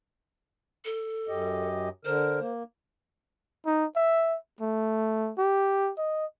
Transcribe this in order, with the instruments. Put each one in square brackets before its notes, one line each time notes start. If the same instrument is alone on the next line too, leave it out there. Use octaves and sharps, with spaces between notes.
[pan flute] A4
[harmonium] F#2 G4 D#5
[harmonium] D3 A#4 [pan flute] C5
[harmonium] A#3
[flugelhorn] D#4
E5
A3
G4
D#5